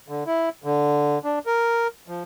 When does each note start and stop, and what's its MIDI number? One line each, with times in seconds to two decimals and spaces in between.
0.08 0.24 50
0.26 0.49 64
0.64 1.19 50
1.24 1.39 62
1.46 1.87 70
2.08 2.23 53